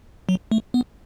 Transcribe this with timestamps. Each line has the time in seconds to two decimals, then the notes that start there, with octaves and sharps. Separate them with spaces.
0.29 F#3
0.52 A3
0.74 B3